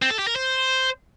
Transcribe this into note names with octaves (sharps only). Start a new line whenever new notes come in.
C4
A4
G4
A#4
C5